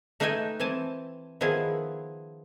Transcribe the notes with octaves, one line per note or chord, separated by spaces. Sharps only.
A3 D#4 B4 E5 G5 G#5
E3 C4 G#5 A5
D#3 F3 B3 E4 G#4